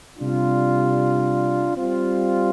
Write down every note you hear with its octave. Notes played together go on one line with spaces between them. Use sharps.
C3 G3 D4 F4
G3 C4 F4